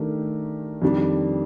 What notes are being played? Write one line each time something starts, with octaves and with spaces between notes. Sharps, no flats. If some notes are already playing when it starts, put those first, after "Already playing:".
Already playing: D#3 A3 D4 G4 A#4
F2 D#3 G3 D4